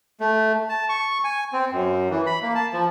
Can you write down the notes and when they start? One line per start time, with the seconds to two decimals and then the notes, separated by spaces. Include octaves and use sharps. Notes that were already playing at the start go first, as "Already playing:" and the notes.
0.20 A3
0.69 A5
0.89 C#6
1.24 G#5
1.53 C4
1.72 F#2
2.10 E3
2.26 B5
2.42 A#3
2.55 A5
2.73 F3